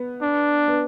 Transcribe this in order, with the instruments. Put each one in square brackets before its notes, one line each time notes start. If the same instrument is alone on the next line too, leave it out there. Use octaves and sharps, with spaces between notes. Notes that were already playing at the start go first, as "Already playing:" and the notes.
Already playing: [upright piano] B3
[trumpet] D4
[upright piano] B3